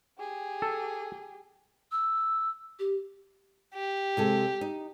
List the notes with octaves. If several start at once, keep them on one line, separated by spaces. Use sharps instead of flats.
G4 G#4
A4
E6
G4
G4
C3 G#3 A4
D#4